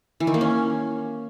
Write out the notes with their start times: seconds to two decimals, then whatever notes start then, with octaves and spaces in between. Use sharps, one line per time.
0.20 E3
0.27 D#3
0.34 A#3
0.41 C#4